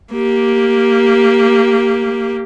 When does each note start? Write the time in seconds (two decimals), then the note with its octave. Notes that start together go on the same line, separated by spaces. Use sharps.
0.12 A#3 G4